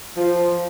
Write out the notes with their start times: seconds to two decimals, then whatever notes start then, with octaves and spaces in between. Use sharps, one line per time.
0.17 F3